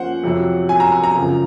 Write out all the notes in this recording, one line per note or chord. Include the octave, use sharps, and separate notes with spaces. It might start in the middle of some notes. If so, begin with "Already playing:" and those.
Already playing: F3 A#3 C#4 C5 F#5
F2 C3 F#3
G#5
A#5
A#5
A#5
F#2 C#3 F3